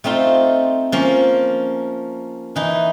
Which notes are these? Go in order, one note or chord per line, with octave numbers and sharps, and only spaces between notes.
A3 C4 D#4 F4
F3 A#3 C#4
E3 D#4